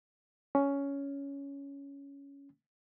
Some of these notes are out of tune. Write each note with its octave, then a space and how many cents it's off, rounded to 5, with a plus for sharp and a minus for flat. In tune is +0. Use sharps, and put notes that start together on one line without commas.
C#4 +10